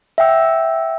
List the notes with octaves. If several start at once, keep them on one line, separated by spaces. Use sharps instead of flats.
E5 F#5 G5 E6